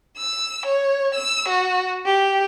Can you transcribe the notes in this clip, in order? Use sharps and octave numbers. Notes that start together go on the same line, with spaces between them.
E6
C#5
E6
F#4
G4